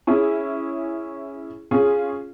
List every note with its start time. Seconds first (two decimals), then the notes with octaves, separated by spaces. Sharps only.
0.07 C#4 E4 G#4
1.71 C#4 F4 G#4